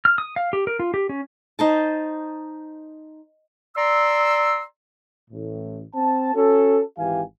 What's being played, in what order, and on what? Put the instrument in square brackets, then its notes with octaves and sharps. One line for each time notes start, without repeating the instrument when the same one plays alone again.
[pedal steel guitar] F6
D#6
F5
G4
A#4
F4
G4
C#4
[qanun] D#4 C5 A5
[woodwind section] D5 A#5 C6 E6
[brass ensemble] A1 A2
C4 A5
C#4 F#4 A4
G#1 E3 G4 F5 G#5